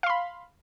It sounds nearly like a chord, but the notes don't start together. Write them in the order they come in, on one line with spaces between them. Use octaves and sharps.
F5 C6 B5